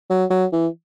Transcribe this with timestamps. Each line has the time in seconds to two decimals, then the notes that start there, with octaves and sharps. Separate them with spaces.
0.10 F#3
0.30 F#3
0.53 E3